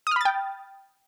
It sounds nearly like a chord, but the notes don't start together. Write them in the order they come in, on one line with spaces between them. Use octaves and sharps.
D#6 F6 B5 A6 G5